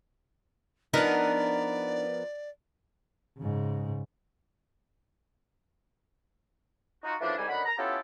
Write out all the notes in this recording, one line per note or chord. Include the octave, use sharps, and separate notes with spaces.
F3 B3 D4 D#4 A#4 D5
G#2 C#3
D#4 F4 F#4
F#2 E3 F3 A3 D4
C2 G#2 G3 G#5
F#2 D3 D#3 F#4 F#5 B5
A#5
B3 C#4 E4 F4 G4 A4